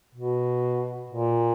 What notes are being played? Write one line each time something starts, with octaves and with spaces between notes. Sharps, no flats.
B2
A#2